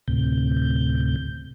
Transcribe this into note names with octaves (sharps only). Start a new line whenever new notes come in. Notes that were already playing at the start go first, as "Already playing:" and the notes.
D2 A2 C3 G6